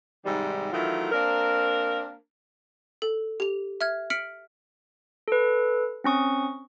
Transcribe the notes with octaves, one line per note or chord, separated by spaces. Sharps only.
G#2 C3 D#3 G3
D#3 E3 F#3 A3 F4
A#3 C4 D4 A#4
A4
G4 F7
E5 F6 G#6
F6 B6 C#7 D7 F#7
A4 B4
C4 C#4 C#6 D#6